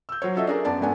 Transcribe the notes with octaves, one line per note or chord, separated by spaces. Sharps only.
E6 G6
F#3 C5 C#5
F4 F#4 A4 D#5 E5
D4 G#4 A#4
F#2 B3 D5 A5
G#1 A3 B3 D4 G#5